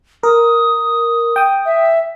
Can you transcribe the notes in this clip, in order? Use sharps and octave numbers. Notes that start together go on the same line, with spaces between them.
A#4 D#6
G5 D#6
E5